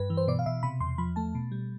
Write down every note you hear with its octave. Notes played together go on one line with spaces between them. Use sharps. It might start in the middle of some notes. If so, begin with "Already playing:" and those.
Already playing: G2 B4
E3
C5
B2 D5
F5
B2 E5
C3 B5
E2 C6
F3 B5
A3 A5
B2
G3